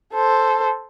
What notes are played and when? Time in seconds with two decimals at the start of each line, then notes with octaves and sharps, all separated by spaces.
0.14 A4 C5